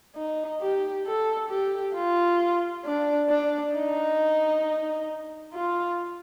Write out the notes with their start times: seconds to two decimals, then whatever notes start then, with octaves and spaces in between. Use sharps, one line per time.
0.16 D#4
0.61 G4
1.06 A4
1.50 G4
1.95 F4
2.85 D4
3.30 D4
3.75 D#4
5.54 F4